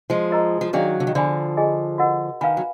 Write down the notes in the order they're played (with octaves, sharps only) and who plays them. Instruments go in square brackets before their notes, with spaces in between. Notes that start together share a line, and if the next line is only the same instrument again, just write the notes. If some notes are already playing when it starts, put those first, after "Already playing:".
[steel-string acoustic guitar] F3 G#3
[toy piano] F4 A#4 D#5 A#5
[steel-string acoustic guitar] F3
[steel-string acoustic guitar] D#3 F#3 [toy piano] D4 G#4 D5 F5
[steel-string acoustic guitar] D3
D#3
[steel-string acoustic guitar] D3 F3 [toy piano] F#4 D5 G#5 B5
[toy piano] F4 G#4 D#5 G#5
F#4 A#4 D#5 F#5
[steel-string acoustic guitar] D#3 [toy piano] B4 F5 G#5 B5
[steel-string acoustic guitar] F#3